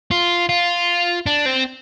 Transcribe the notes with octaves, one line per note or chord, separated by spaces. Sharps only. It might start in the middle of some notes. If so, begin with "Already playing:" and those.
F4
F4
D4
C4